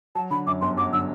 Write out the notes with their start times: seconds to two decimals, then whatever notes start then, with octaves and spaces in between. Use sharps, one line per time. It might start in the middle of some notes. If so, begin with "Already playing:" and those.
0.15 F#3 A5
0.31 D3 B5
0.47 F#2 D6
0.61 G1 C6
0.77 F#3 D6
0.93 D3 E6